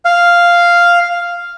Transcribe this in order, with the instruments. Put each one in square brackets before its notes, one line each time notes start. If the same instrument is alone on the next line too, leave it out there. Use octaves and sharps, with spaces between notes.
[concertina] F5